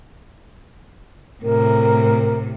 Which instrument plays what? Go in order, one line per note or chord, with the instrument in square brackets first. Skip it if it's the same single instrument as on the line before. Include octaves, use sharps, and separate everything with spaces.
[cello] A2 C3 [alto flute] A#4